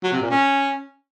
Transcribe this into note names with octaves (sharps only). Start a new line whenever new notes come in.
F#3
C3
A#2
C#4